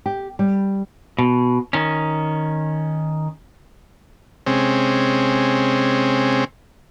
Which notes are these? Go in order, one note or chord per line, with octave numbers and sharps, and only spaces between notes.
G4
G3
B2
D#3 C#4
C3 G#3 C4 C#4